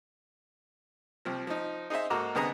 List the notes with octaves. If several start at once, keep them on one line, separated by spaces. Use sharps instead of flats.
C2 F3
F3 D#4
D#4 G#4 C5 D#5 E5
G#2 A#3 F#4 A4 A#5 D6
C2 D3 B3 G#4 D#5 A#5